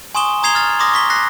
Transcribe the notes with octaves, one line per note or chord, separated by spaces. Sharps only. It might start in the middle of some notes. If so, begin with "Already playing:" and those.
G#5 C6 C#6 D#6 E7 G7
A#5 D#6 G#6 C7 F7 G7
F6 A6
C6 D6 D#6 A#6
C#6 B6 G7
F#6 A#6 C7